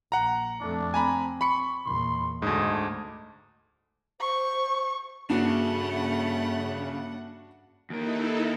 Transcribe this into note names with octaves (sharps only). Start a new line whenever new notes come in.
A#1 F#5 A#5
F2 A3 D4
C4 G#5 A#5 B5
B5 C#6 C#7
E2 A#2 C6
D2 G#2 A3 D4 D#5
C5 C#6
G2 C#3 A3 A#3 C#4 D4 F#4 F#5
D#2 D#4 E4 A4 A#4